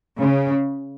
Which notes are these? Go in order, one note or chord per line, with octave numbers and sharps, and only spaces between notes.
C#3